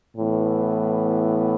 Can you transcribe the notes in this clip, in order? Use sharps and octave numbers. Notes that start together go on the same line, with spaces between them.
A2 E3 B3